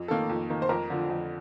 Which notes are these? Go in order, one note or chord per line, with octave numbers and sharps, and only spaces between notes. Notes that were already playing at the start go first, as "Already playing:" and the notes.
Already playing: F2
D#3 A#3 A4
F2
D#3 A#3
C5
F2 A#4
D3 F3
F2